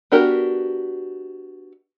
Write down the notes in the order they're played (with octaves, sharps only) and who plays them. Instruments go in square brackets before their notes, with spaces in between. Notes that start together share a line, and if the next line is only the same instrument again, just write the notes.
[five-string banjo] B3 D4 F#4 G4 A#4